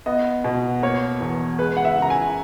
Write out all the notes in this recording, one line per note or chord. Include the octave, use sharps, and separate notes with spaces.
B3 D#5
B2
A#3 C#5
E2
G#3 B4
F#5
E5
C#3 A#5
G#5